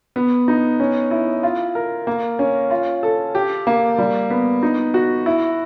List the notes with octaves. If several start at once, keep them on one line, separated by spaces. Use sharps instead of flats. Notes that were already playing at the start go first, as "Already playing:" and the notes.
B3
D#4
C#4
E4
F4
A#4
A#3
C#4
F4
A4
G4
A#3
G3
B3
D#4
F#4
E4